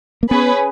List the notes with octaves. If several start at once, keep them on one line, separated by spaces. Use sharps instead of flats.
A#3
B3 C#4 G#4 B4